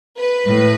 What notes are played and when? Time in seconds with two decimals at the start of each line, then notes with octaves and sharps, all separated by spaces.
0.18 B4
0.47 A2